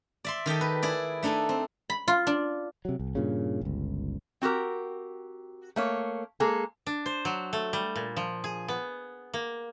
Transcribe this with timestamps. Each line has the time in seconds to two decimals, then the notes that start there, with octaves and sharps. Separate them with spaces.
0.25 D5 E5 C6
0.46 D#3 G4 A4 D#5
0.61 B4
0.82 E4 G#4 D5
1.23 A3 D4 D#4 A4 G#5
1.49 C4
1.90 B5
2.08 F4
2.27 D4
2.85 C3 F#3
2.99 C2
3.15 G2 A#2 C#3
3.61 G1 C#2
4.42 C4 F#4 G4 A#4
5.76 A3 A#3 C#5
6.40 G#3 A#3 G#4 A4
6.87 D4
7.06 C5
7.25 F#3
7.53 A3
7.73 G3
7.96 A#2
8.16 F3
8.44 G#4
8.68 B3
9.34 A#3